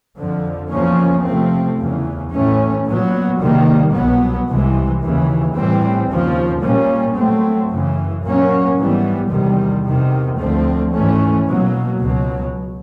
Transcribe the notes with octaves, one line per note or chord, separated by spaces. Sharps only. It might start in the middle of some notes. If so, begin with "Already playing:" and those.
F2 D3 F3
E2 C#3 F3 A#3 C#4
C3 F3 A3 C4
E2 C#3 E3
A2 E3 A3 C#4
A#2 F#3 B3
C3 D#3 G3 A#3
C2 B2 F#3 B3
C2 C3 E3 G#3
D#2 C#3 E3
A2 E3 G3 C4
D#2 C#3 F3
A#2 G3 A#3 C#4
A#2 F#3 A3 C4
F#2 C#3 E3
A#2 F#3 A#3 C#4
G#2 E3 G3 B3
E2 C3 D#3 G3
E2 C3 D#3
D2 D3 F3 A3 C4
G#2 E3 A3 C#4
B2 F#3 A#3
C#2 B2 F#3